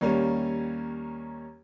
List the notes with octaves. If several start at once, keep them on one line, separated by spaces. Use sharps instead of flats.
D#2 G3 A#3 C#4